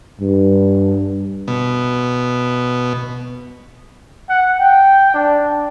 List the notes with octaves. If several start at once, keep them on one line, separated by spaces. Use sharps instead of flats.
G2
B2
F#5
G5
D4